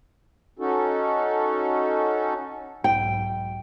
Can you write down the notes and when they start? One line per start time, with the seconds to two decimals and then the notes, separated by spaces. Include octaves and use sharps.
0.59 C#4 D#4 F#4 A4
2.84 B1 G#2 G5